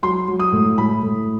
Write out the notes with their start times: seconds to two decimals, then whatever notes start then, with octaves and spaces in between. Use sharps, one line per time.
0.03 F#3 C6
0.28 F#3
0.39 D#6
0.53 A2
0.77 A2 B5
1.02 A2